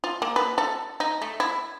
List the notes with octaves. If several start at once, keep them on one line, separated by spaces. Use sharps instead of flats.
F4
A#3
B4
A4
D#4
A3
E4